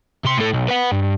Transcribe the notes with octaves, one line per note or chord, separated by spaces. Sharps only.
C3 C6
A2 A4
B1
B4 F#5
G2